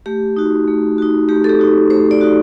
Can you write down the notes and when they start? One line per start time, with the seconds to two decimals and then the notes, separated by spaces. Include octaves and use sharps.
0.06 A3 G4
0.37 D#4 F#4
0.68 A3
0.98 D#4 F#4
1.29 A3 G4
1.44 A4
1.49 G4
1.60 D#4 F#4
1.90 A3 C5
2.11 D5
2.21 D#4 F#4